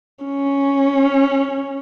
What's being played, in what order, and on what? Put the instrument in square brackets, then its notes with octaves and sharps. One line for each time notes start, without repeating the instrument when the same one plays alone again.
[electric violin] C#4